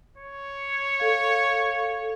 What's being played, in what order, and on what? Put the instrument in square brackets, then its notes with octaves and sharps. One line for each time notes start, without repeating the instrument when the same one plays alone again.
[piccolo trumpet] C#5
[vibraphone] A4 F5